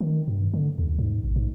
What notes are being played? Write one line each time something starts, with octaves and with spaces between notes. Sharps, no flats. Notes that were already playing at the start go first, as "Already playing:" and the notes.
D#3
G2
D3
D#2
G#2
A1
G#2